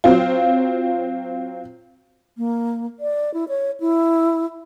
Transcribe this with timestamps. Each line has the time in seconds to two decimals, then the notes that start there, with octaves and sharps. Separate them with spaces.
0.04 F#3 C4 F4
2.38 A#3
3.00 D5
3.34 E4
3.48 C#5
3.80 E4